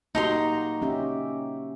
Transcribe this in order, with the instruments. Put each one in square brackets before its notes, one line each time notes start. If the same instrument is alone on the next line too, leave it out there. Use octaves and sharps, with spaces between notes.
[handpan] A#3 F#4 G4 [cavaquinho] D#4 A#5 C6
[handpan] C#4 G4 E5